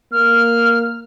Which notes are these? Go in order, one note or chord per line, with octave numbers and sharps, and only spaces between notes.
A#3 F6